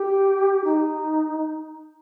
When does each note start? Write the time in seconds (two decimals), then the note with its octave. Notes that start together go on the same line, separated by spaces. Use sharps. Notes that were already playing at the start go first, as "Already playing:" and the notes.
Already playing: G4
0.64 D#4